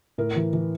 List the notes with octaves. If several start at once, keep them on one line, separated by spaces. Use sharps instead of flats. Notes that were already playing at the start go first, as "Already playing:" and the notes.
A2 A#4
E3
E3